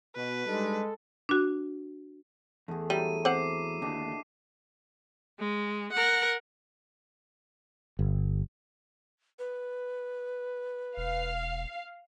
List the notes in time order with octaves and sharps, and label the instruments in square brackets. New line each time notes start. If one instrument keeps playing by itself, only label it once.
[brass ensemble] B2 [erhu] B4
[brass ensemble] G3 D4 D#4 [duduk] G#3 [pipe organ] A4
[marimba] D4 F#4
[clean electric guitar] E2 [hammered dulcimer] A3 G#4
[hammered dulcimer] F#3 E4 [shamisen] G3 [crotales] D#7
[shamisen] C4 F#5 [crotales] D6 C7
[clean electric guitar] D#2 D3 [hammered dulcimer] D4 G4 D#5
[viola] G#3
A#4 F#5
[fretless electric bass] G1
[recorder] B4
[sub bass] E1 [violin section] F5